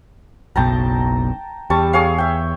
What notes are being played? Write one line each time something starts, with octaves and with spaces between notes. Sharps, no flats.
F#1 B1 B2 G5 A5 A#5
E2 G3 A5 C#6
G#4 C#5 F5
E5 G5